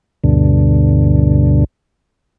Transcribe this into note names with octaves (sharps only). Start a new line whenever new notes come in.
D2 G2 B2 D3